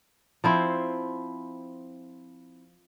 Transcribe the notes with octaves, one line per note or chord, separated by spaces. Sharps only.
F3 C4 E4